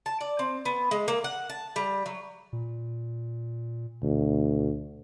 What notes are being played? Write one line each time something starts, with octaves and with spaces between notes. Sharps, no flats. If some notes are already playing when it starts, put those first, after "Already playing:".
A5
D5
C4
B3
G#3
A#3
F#5
A5
G3
F#3
A#2
D2 B2